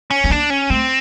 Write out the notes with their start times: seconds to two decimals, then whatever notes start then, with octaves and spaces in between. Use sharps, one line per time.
0.11 C#4
0.24 B3
0.30 A#3 D4
0.50 C#4
0.70 A3 C4